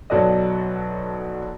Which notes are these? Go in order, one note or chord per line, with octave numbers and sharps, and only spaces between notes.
B1 F#3 F#4 A4 D5 D#5